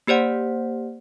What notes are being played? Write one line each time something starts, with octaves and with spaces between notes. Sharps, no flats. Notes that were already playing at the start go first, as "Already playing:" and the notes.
A#3 G4 C5 D5 F#5